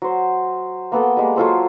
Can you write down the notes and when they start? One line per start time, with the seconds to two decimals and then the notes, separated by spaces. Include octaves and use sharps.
0.02 F#3 C5
0.92 A#3 B3 A4 G5
1.17 G3 G#3 A#3
1.36 F#3 F4 A4 C5